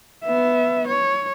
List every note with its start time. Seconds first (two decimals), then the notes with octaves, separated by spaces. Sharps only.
0.24 B3 E5
0.87 C#5